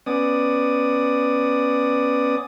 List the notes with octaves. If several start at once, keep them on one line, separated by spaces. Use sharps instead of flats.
B3 C#4 D5 D#6